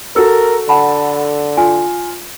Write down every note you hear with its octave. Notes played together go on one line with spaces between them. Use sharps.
F#4 A4 A#4 E6
D3 F#5 A5 B5
F4 G#5